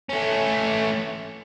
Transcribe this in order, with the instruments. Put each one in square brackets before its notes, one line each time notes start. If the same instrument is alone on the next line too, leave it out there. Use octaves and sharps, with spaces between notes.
[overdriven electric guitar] A3 C#4